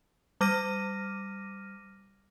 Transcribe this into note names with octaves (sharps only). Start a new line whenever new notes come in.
G3 D6 F6 A#6 D#7